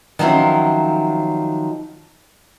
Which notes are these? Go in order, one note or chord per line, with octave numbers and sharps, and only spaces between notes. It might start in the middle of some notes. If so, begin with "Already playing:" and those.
D#3 F3 F#3 C4 C#4 E4